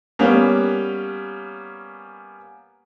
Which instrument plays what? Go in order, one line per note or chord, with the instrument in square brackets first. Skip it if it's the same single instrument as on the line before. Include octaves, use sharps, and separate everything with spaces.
[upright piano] G3 A#3 B3 C#4